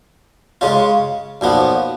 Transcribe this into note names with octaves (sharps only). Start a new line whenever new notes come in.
C#3 G#3 C#4 F4
B1 A#2 F3 B3